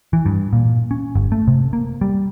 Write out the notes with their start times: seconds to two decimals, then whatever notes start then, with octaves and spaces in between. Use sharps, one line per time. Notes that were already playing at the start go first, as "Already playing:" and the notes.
0.13 E3
0.26 G2
0.53 A#2
0.91 C#4
1.15 G1
1.32 A3
1.47 C3
1.73 A#3
2.01 G3